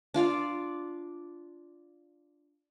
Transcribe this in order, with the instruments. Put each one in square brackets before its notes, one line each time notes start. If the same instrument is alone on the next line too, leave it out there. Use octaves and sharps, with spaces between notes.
[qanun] D4 F4 D5 F5